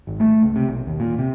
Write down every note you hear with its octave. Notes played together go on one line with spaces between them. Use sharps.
G#1
A3
C#2
C3
B1
D#2
A#2
C3